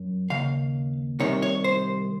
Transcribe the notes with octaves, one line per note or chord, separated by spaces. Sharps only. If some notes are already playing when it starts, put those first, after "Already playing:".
Already playing: F#2
D#2 C#3 F5
C2 C3 D#3 C#5
C#5
C5